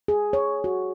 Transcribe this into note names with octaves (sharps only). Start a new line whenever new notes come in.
G#4
C#5
F#4